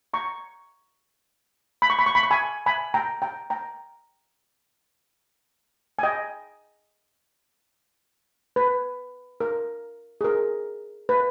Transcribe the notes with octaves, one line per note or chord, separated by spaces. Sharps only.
A#5 C#6
B5
C#6
B5
C#6
B5
C#6
G#5 B5
G#5 B5
G5 A#5
G5 A#5
G5 A#5
G#5
D#5 G5
B4
A#4
G#4
A#4
B4